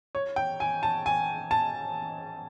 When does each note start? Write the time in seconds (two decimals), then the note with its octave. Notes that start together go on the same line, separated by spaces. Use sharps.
0.15 C#5
0.36 G5
0.60 G#5
0.83 A5
1.06 G#5
1.51 A5